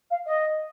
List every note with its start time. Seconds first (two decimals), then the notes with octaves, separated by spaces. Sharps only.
0.10 F5
0.26 D#5